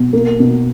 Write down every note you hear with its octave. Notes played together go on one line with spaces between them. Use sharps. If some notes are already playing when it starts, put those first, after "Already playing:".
Already playing: B2
A#3
B2